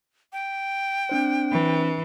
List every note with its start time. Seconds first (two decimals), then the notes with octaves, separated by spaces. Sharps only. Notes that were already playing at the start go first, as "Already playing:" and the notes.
0.33 G5
1.09 C4 D4 C5
1.51 E3